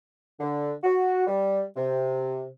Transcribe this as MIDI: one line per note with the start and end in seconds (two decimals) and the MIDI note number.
0.40 0.72 50
0.84 1.25 66
1.27 1.62 55
1.77 2.46 48